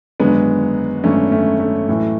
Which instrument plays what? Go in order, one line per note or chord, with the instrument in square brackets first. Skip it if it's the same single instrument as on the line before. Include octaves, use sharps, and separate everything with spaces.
[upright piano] G#1 F#2 D3 G#3 B3
G#1 F#2 D3 A3 C#4
A3 C#4
A3
B1 A2 E3